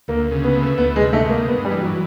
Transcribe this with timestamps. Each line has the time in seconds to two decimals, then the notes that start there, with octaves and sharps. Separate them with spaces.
0.08 D2 A#3
0.32 C#3
0.44 B3
0.55 A3
0.78 D2 B3
0.96 G#3
1.01 C3
1.13 A3
1.25 G#3
1.30 A#3
1.48 G2 B3
1.65 G3
1.71 E3
1.82 F#3